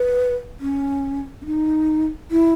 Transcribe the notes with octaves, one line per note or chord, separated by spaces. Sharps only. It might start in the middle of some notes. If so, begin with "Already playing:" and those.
Already playing: B4
C#4
C#4
D#4
E4